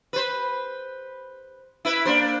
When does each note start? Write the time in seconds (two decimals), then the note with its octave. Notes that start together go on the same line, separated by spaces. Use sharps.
0.13 B4 C5
1.85 E4 B4
2.05 A#3 D4 C5